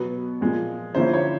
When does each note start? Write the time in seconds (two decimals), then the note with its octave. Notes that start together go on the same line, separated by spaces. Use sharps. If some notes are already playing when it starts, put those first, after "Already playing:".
Already playing: B2 F#3 B3
0.41 A#2 F3 G#3
0.95 D3 F3 A#3 C#4 E4 C5
1.14 C#5